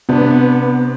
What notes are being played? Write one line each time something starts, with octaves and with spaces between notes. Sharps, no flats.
C3 B3 D4